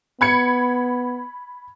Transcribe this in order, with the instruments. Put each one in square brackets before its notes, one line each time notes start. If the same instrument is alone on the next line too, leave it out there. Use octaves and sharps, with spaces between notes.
[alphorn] B3 [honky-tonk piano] B5 G#6 C#7